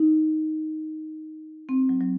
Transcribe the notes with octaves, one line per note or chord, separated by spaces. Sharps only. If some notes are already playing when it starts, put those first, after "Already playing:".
Already playing: D#4
C4
F#3
F#3